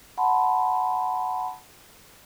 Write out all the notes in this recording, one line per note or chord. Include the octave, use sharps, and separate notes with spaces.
F#5 A5 B5 C6